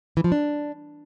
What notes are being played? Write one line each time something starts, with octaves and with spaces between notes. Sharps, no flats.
E3
F3
D4